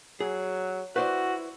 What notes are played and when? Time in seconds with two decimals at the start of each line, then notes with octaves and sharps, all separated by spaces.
0.20 F#3 G#4
0.96 E4 F#4 B4 C5 D5